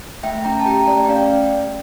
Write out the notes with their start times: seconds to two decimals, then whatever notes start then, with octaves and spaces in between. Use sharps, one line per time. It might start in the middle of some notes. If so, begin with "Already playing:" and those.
0.23 A3 E5 G5
0.45 C#4 G5 A#5
0.59 A5
0.66 G4 G5 A#5
0.87 A3 D5
1.05 G5
1.09 C#4 D5 F5